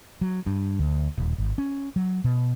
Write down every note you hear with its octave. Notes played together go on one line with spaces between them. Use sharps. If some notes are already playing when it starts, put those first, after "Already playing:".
F#3
G2
D2
D#1
G#1
C#4
F#3
B2